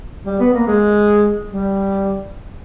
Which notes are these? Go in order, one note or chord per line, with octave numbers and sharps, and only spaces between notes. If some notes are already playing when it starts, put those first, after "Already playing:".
G3
B3
A#3
G#3
G3